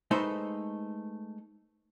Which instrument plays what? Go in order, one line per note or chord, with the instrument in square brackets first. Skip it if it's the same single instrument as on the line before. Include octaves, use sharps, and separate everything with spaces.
[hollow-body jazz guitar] G#3 A3 D#4 A4 B4 C5